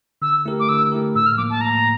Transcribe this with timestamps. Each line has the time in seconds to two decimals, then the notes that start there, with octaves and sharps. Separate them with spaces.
0.22 D3 E6
0.45 A3 E4 G4 A#4
0.59 D6
0.69 D3 E6
0.92 A3 E4 G4 A#4
1.15 A2 E6
1.26 F6
1.37 F3 A#3 D6
1.50 A5
1.60 A2 A#5